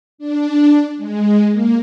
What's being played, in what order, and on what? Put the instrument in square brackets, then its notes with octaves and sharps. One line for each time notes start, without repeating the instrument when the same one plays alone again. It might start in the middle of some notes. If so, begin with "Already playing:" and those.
[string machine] D4
G#3
A#3